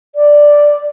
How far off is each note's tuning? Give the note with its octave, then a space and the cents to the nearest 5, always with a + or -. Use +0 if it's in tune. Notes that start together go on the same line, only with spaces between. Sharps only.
D5 +0